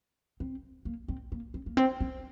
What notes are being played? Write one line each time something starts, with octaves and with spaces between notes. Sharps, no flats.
C4
A#3
C4
A#3
C4
A#3
C4
C4